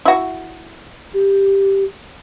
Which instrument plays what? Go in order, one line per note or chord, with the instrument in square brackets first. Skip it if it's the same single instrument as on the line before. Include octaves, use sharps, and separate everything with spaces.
[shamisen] E4 F#4
[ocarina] G4